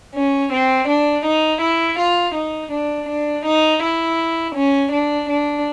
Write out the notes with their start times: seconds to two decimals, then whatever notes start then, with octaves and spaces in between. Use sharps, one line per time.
0.14 C#4
0.51 C4
0.88 D4
1.24 D#4
1.61 E4
1.98 F4
2.35 D#4
2.71 D4
3.08 D4
3.44 D#4
3.81 E4
4.54 C#4
4.91 D4
5.28 D4